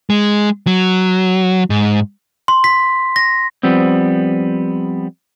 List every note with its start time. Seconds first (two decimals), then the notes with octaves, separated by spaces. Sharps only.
0.10 G#3
0.67 F#3
1.70 G#2
2.48 C6
2.64 B6
3.16 A#6
3.63 F3 G3 B3 C4